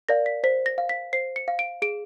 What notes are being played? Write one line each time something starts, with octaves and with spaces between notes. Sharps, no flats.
A#4 D5 F5 A#6
B6
C5 B6
A#6
F5
B6
C5 C7
C#7
F5
D7
G#4 D7